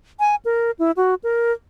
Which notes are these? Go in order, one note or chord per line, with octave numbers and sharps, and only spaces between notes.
G#5
A#4
E4
F#4
A#4